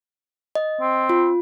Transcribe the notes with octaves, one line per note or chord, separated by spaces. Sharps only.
D#5
C4
F4